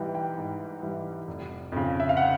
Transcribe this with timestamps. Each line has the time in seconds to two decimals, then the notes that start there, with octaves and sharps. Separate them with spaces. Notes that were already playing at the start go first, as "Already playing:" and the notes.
Already playing: G#2 E3 G3 G5
0.15 G5
0.38 G#2
0.82 E3 G3
1.28 F1
1.72 F2 C#3
2.00 E5
2.09 F5
2.17 F#5